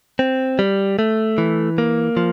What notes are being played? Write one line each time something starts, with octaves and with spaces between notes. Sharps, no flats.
C4
G3
A3
E3
A#3
F3